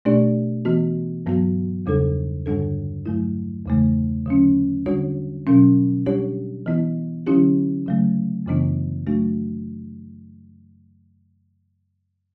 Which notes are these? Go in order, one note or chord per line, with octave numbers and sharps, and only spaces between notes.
B2 A3 D4 G4 D5
E3 B3 F#4
G2 F#3 B3 F#4
E2 C#3 G3 D4 A4
G2 D3 G3 D4 A4
G2 F#3 A3 E4
E2 C#3 E3 A3
D3 F#3 C#4
D3 G3 D4 F#4 C#5
B2 F#3 C#4
G3 D4 G4 C#5
E3 B3 E4
D3 F#3 C#4 E4 G4
C#3 F#3 A3
F#2 C#3 E3 B3 D4
F#3 A3 D4 F#4